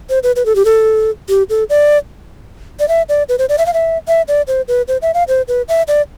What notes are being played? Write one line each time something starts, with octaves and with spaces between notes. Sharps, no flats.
C5
B4
B4
A4
G4
A4
G4
A4
D5
D5
E5
D5
B4
C5
D5
E5
F5
E5
E5
D5
C5
B4
C5
E5
F5
C5
B4
E5
D5